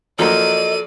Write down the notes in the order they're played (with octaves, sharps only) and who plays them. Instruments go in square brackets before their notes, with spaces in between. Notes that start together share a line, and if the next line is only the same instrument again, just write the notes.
[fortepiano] F3 F#3 A#3 [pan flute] A4 [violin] D5 D#7 [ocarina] D#5